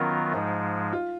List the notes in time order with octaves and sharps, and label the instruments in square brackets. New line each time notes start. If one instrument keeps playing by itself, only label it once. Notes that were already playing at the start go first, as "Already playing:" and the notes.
Already playing: [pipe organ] D#3 F#3 B3 F4 A#4 [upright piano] C#4
[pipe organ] G#2 F3 G#3 [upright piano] D#4
[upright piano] F4